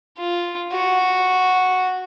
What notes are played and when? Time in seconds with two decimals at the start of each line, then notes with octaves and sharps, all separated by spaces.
0.19 F4
0.72 F#4